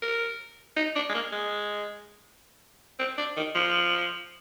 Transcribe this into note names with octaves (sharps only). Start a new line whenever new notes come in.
A#4
D#4
D4
G#3
A#3
G#3
C4
D4
D#3
F3